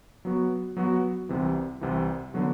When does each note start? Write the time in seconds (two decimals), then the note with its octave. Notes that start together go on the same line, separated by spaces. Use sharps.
0.25 F#3 B3 F#4
0.77 F#3 B3 F#4
1.29 C2 C3 E3
1.81 C2 C3 E3
2.34 D3 F#3 B3 F#4